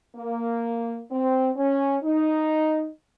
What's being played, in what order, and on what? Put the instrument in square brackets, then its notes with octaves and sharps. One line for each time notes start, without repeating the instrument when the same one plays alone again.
[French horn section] A#3
C4
C#4
D#4